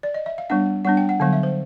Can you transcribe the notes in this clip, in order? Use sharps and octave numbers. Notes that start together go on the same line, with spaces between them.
D5
D#5
E5
F5
G3 B3 D4 F#5
G3 B3 D4 F#5
G5
F#5
D3 F#3 B3 F5
E5
C5